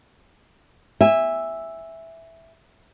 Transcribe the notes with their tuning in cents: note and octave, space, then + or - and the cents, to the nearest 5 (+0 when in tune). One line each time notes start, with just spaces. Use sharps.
E5 +0 G#5 -25